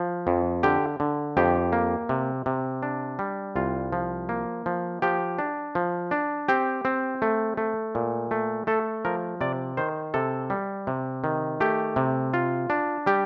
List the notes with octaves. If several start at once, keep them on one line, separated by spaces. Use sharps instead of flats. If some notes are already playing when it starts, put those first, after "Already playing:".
Already playing: F3
F2
D3 G4
D3
F2 G4
A#3
C3
C3
D4
G3
C2 F4
F3
A#3
F3
F3 G4
D4
F3
D4
C4 G4
C4
A3
A3
A#2
A3
A3 A4
F3 A#4
C3 D5
D#3 C5
C3 A4
G3
C3
D#3
A3 G4
C3
F4
D4
G3 G4